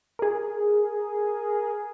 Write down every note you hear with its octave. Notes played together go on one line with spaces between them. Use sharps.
G#4 A#4